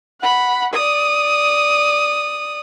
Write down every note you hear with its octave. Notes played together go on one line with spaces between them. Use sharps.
F#5 B5
D5 D#6